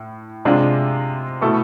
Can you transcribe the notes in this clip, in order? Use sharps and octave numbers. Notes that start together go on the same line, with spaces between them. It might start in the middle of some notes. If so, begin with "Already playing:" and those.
Already playing: A2
C3 G#3 D4 F4
B2 A3 E4 A4